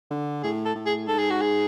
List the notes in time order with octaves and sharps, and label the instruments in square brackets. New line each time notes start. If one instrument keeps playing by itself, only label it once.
[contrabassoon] D3
[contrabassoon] A2 [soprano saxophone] G#4
[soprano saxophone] A4
[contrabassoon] A2
[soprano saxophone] G#4
[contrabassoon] G#2 [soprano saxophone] A4
[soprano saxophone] G#4
F#4
G#4